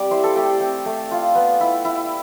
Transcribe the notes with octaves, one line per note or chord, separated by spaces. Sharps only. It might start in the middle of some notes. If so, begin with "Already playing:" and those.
Already playing: G3 C4 D5
E4 C5
A4
A3 G4
C4
A3
F4
B3
E4
E4